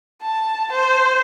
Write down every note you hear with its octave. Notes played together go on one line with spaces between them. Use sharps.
A5
C5